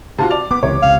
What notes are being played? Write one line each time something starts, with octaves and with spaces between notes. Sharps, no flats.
C3 F4 F#4 A5
D5 F7
B3 D6
C#2 C3 E3 C#5
C#2 C3 F5